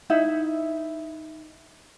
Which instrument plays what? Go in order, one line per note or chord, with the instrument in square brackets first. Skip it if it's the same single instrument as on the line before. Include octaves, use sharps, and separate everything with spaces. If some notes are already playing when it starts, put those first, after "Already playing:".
[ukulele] D#4 E4 E5